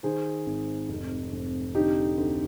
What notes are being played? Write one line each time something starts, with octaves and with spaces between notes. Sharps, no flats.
D#3 G#4 C5
G#1
F1
F1
D3 D#4 G4
D2